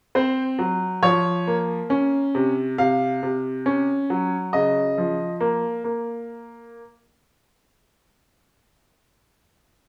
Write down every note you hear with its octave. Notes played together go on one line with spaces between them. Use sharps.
C4 C5
F#3
F3 C#5
A#3
C#4
C3
C3 F5
C3
C#4
F#3
C#3 D#5
F3
A#3
A#3